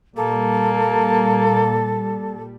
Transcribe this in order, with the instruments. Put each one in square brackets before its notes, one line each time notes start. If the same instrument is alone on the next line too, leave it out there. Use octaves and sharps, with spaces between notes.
[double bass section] A#2 G3 [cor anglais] A#3 [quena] A4